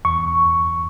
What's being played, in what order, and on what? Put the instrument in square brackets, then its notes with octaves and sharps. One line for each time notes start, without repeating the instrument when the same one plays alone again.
[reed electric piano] E2 C#6